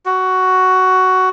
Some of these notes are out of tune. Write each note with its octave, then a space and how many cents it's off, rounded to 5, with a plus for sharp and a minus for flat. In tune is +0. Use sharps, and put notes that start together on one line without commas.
F#4 +10